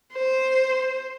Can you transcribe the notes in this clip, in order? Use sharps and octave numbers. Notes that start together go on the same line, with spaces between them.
C5